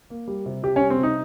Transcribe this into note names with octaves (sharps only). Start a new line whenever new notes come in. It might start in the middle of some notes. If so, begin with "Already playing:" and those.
A#3
G3
C3
C3 G4
C#4
G3
C4
C3
D#4